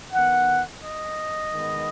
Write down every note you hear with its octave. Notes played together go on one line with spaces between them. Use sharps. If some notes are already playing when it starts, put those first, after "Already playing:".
D#3 B3 F#5
D#5
D#3 G#3 B3